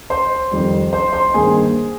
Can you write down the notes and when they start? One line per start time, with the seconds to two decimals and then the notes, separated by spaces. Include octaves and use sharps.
0.10 C5 C6
0.52 F2 D#3 G3
0.93 C5 C6
1.13 C5 C6
1.34 G2 D#3 A#3 D#4 G#4 G#5